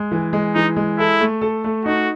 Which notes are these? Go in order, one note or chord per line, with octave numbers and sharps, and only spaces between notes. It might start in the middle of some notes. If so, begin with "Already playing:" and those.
Already playing: G#3
E3
G#3
E3 D#4
G#3
E4 A4
A3
A4
A3
D#4 F#4